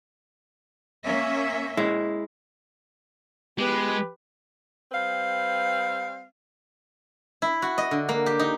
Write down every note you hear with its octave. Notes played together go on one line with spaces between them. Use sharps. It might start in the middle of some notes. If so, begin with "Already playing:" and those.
A#3 C#4 E5
G#3 E4
G#3 B3 G4 B4
G3 C4 B4 F5
E4
F#4
D#5
D3
A#3
G4
D#4